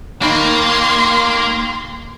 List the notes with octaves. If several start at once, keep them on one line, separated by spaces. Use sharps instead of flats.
D#2 D#3 A#3 B5 C6